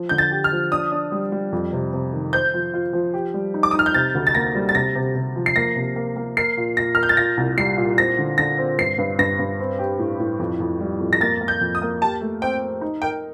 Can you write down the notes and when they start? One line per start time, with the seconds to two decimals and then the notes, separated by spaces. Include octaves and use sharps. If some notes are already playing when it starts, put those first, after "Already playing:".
Already playing: F3
0.09 D3 G6
0.18 A6
0.31 G4
0.44 F6
0.52 F3
0.71 D4 D#6
0.92 D4
1.12 G3
1.32 G3
1.52 F2
1.73 C3
1.93 C3
2.13 D#3
2.33 C5 G6
2.54 F3
2.74 F4
2.93 F3
3.14 G4
3.34 G3
3.54 D#4
3.63 D6
3.71 D#6
3.75 D#4 F6
3.86 G6
3.94 C3 A6
4.15 D2
4.27 A6
4.35 A#3 A#6
4.55 G3
4.69 A6
4.75 C3 A#6
4.95 C3
5.15 C3
5.36 F3
5.46 C7
5.56 A#3 A#6
5.76 C3
5.96 A#3
6.16 A#3
6.37 A#4 C7
6.57 A#2
6.77 A#2 A#6
6.95 A#4 F6
7.03 G6
7.09 A6
7.17 A#2 A#6
7.37 C2
7.57 G3 C7
7.77 A#2
7.98 C4 A#6
8.19 D3
8.38 D3 A#6
8.58 C4
8.78 G2 C7
8.98 G2
9.19 G2 A#6
9.39 G2
9.60 C4
9.79 G4
9.99 A2
10.20 A2
10.40 F2
10.60 F2
10.80 G3
11.00 F2
11.13 A#6
11.21 A#3 A6
11.41 A#3
11.48 G6
11.61 F2
11.75 D#6
11.82 A#3
12.01 G4 A5
12.21 A3
12.42 C4 G5
12.62 C4
12.81 D#4
13.02 A#4 G5